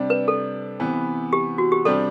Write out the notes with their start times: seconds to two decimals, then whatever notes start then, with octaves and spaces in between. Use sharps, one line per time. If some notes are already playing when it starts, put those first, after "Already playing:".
Already playing: C3 G3 D4
0.10 B4
0.28 A4
0.80 C3 E3 B3
1.33 G4
1.58 F#4
1.72 G4
1.85 C3 G3 D4 A4